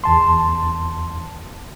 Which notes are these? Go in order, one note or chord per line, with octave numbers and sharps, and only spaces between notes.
E2 A5 C6